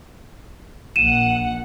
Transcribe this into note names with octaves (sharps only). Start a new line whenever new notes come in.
A#1 F#5 D#7 E7